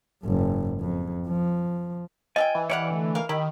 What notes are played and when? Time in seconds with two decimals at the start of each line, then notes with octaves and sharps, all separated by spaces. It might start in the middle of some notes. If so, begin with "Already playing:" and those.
0.23 F#1 G#2
0.80 F2
1.29 F3
2.36 F3 A4 D#5 G5 G#5
2.55 E3
2.70 G3 B4 C#5 D5 F5 F#5
2.90 D3 A3
3.15 A#4 F5
3.29 D#3 E4 G4 B5